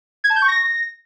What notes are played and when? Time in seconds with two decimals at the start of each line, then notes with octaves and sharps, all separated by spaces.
0.24 G#6
0.30 A5
0.36 G6
0.42 C#6
0.48 A#6